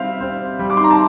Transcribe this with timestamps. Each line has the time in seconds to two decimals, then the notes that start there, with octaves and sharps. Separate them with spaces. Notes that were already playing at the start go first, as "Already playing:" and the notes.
Already playing: G3 C4 E5 F5
0.20 C4
0.59 G3
0.70 D6
0.77 C6
0.84 A#5
0.91 A5